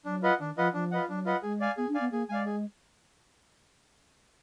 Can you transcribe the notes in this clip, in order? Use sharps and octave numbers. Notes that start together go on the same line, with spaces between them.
F#3 D4
F4 B4 D#5 F#5
D#3 D4
F3 F4 B4 D#5 F#5
F3 D4
F4 B4 D#5 F#5
F#3 D4
F4 B4 D#5 F#5
G#3 G#4
D5 F5 G#5
B3 G#4
D4
D5 F5 G#5
B3
A#3 G#4
G#3 D5 F5 G#5
G#4